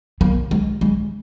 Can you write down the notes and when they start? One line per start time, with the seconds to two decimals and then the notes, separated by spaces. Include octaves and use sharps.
0.21 A#3
0.51 G#3
0.81 G#3